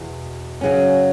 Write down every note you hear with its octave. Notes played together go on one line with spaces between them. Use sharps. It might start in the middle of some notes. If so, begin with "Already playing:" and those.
Already playing: E2 B2
F#2 C#3 F#3 C#4